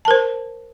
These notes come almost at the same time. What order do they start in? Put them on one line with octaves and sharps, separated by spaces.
A5 A#4 C5